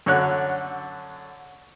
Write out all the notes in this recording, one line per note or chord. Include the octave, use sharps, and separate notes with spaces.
F#2 D3 C#5 F#6